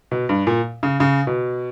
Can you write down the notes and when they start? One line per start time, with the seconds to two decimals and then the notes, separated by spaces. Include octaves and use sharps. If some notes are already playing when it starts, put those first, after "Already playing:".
0.11 B2
0.29 G2
0.47 A#2
0.83 C#3
1.00 C#3
1.27 B2